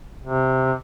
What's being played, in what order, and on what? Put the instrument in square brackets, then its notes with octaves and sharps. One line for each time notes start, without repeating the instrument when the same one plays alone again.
[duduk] C3